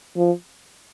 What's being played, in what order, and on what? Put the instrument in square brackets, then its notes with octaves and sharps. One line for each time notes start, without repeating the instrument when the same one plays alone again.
[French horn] F3